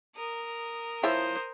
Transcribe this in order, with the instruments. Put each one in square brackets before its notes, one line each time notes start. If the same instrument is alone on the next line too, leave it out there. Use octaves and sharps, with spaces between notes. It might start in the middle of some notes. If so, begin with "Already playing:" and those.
[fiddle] A#4 D#6
[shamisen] F3 E4 C#5 [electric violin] C5